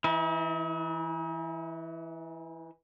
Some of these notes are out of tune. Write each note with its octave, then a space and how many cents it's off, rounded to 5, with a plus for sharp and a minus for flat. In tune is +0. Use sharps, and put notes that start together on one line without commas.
E3 +0 D#4 +45